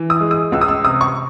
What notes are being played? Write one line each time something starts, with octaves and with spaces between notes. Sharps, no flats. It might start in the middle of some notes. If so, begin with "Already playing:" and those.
Already playing: E3
D#6
G#3
D#6
C#2 E6
D#6
E6
C3 D#6
C#6